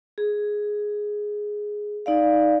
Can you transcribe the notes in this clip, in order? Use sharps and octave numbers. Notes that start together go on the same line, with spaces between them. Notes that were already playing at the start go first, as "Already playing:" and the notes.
G#4
D#4 D5 F5